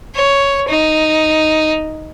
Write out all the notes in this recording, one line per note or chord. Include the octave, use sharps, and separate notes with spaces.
C#5
D#4